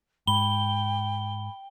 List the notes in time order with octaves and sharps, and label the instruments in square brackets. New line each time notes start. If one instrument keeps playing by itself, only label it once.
[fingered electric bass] G#2 [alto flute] G5 [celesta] B5 [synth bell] G7